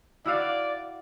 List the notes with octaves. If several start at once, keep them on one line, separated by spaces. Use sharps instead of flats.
E4 F#4 D5 F5